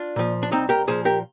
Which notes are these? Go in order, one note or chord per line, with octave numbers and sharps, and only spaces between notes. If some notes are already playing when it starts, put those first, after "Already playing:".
Already playing: D4 F4
A#2 F3
D4
C2 C4 D#4
G4 A#4
A#2 F3 G#4 C5
G4 A#4